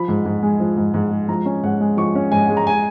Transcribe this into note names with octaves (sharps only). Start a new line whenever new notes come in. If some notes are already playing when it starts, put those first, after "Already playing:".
Already playing: F3 B5
G#2
G#2
G#3
F3
G#2
G#2
G#3
F3 A#5
C#4
G#2 F#5
G#3
F3 C#6
C#4
G#2 G#5
G#3
A#5
G#5